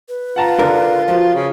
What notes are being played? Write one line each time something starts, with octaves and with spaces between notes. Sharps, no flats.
B4
F4 F#5 A5 A#5
D3 D4 A#4
F3 F#4
C#3